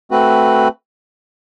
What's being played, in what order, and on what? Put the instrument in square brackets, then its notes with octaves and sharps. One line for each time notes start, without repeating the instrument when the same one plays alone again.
[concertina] A3 C4 F#4 B4